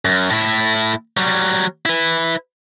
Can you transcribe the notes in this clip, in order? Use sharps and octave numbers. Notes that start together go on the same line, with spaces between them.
F#2
A2 E4
F#3 G3
E4 B4